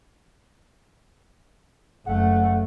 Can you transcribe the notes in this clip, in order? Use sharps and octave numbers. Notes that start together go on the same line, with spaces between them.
F#1 A3 F#5